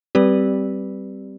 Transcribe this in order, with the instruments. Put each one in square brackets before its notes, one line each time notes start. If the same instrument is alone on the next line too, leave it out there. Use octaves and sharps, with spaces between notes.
[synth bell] G3 C4 G4 B4 D5